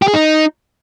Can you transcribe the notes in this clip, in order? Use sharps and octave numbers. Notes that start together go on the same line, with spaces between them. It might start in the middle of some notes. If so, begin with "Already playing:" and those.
G4
G#4
D#4